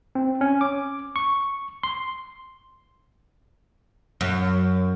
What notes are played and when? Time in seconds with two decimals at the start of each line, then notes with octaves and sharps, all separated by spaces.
0.15 C4
0.41 C#4
0.61 D6
1.16 C#6
1.83 C6
4.21 F#2